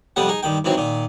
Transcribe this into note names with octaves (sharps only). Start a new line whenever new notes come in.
F2 C3 G3 B3 F#5
D#4 G#4
G2 D#3 G5
G#2 E3 F#3 C4
A#2 D#3